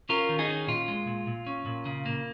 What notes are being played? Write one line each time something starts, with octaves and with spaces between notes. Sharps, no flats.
C#4 F4 A#4
D#3
D#4 G#4
C#4
A#2 F4
G#3
A#2
A#2
C#4
A#2
C#3
A#3